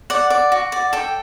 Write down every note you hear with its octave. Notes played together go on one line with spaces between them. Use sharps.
D5 F#5
D5
F#4
D5
A4 G5